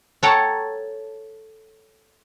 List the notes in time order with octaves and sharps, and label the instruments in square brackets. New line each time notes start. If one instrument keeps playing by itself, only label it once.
[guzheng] A4 C#5 F#5 G5 A5 A#5